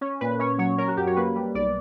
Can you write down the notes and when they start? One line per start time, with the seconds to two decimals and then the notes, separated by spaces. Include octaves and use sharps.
0.01 C#4
0.21 A#2 B4
0.39 C#4 C#5
0.58 F#3 C#5
0.78 C#4 A#4
0.88 F#4
0.97 F#2 G4
1.07 C#5
1.16 A#3 B4
1.36 G3
1.54 B1 D5